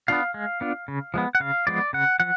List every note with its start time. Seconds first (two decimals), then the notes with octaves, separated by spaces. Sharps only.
0.08 B3 D4 F4 F5
0.34 G#3
0.61 B3 D4 F4
0.88 C#3
1.14 F3 G#3 B3
1.35 F#5
1.40 C#3 F5
1.67 F3 G#3 B3 D5
1.93 C#3 F#5
2.20 F3 F#5